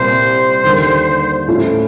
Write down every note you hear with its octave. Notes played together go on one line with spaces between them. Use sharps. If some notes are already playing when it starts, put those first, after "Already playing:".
Already playing: C2 A#2 G3 C5
D#2 D3 G3 A#3
A2 F3 A3 C#4 F4